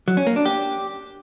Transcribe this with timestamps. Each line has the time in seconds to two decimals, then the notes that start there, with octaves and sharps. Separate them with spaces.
0.08 F#3
0.17 C#4
0.27 A#3
0.36 D4
0.46 G4